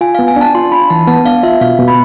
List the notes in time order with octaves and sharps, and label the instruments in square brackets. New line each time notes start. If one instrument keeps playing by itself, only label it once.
[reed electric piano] F4 [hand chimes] G#5
[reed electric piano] B3 [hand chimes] F5
[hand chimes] G#5
[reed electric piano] D4 [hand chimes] A5
[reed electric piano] F4 [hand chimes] C6
[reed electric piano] D4 [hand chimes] B5
[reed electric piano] E3 [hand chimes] A5
[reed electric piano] B3 [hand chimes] A5
[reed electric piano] D4 [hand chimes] F5
[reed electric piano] F4 [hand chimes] E5
[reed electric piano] B2 [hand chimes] F5
[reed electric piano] B2
[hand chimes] B5